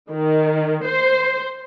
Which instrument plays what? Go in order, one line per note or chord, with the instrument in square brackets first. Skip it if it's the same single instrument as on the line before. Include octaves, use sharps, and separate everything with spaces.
[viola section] D#3
C5